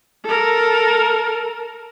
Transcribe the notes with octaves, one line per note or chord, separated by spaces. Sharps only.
A4 A#4